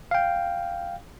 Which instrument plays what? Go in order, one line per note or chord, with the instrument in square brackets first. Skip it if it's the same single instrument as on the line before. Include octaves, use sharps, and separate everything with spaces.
[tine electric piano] F5 G5